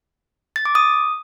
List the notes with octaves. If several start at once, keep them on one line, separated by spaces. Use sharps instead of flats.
A6
D6
D#6